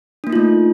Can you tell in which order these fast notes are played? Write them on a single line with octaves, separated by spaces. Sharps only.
D4 A#3 D#4 F4 A3